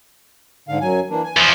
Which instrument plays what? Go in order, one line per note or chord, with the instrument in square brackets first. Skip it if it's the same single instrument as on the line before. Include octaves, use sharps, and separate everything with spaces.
[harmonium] G#2 D3 F5
F#2 F#3 G#5
E3 A#3 D4
G#5
[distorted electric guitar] E2 F3